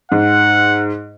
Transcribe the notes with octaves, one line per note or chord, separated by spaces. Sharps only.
G#2 F#5